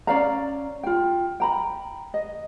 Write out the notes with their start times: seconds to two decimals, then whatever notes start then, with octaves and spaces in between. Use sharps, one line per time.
0.07 C#4 D5 F5 A#5
0.83 F4 G5
1.40 G5 A#5 B5
2.14 D#5